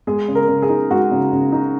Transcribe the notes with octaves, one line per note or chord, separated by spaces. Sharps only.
G#3 G#4
C#3
A#4
C#3
G#4
D#4
G#3 F#4
C#3
C#3
D#4